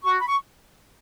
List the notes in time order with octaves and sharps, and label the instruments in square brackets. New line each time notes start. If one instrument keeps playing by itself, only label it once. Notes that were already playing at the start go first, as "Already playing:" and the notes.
[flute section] F#4 C#6
B5
C#6